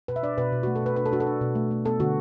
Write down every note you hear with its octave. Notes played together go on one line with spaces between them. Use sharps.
B2 B4
E5
D4 D5
B2 B4
B2
F#4
A3
A4
B2 B4
D4 B4
A4
D4 F#4
A4
D4
B2
A3
A3
B3 A4
D3 F#4